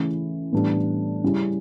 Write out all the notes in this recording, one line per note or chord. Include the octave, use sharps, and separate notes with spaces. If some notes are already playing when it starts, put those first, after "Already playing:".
Already playing: C#3 E3 A3 C#4 E4
A2 E3 G3 B3 D4
C#3 G3 C#4 E4